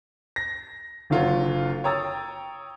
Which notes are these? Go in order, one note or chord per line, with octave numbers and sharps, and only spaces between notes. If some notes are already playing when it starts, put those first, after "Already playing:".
A#6
F#1 D3 F#3 F4 C#5
C#5 G5 A#5 D#6 E6 A6